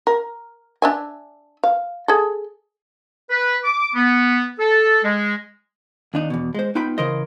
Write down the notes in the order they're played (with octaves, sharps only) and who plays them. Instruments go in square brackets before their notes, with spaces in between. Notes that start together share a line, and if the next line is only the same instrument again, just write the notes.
[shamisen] A#4
D4 E5 G#5
F5
G#4 A4
[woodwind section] B4
D6
B3
A4
G#3
[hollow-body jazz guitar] D#2 D4 D#4
E2 B2
G#3 C5
B3 D#4 F4 G5 B5
C#3 E3 A#4 C5 D#5